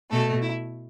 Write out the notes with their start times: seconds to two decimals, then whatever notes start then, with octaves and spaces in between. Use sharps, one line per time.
0.11 B2 A3 A4
0.41 E4